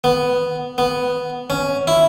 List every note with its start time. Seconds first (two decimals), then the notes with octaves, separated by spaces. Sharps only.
0.04 B3
0.78 B3
1.50 C#4
1.87 E4